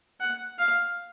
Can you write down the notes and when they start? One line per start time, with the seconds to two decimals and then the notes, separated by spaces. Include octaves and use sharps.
0.20 F#5
0.59 F5